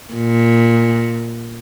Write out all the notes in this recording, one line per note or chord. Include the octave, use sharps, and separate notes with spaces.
A#2